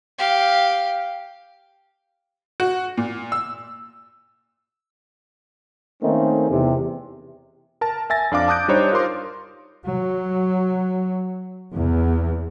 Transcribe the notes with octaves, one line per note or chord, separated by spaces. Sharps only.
G4 F5
F#4
A#2
E6
D#3 A3 A#3 C4 C#4 D#4
E2 C3
A#4 A5
E5 G#5 A6 A#6
F2 D4 F5 D6
A5 D#6 F#6 G6 D7
G3 D4 D#4 C5 C#5
F4 A#4 C5 C6 D6
F#3
E2